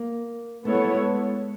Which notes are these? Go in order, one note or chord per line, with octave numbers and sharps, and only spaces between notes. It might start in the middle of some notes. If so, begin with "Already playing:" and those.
Already playing: A#3
A3 B3 E4 A4 C#5
G3
G3
G#3